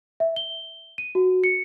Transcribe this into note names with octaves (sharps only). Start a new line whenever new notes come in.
E5
G7
D#7
F#4
C#7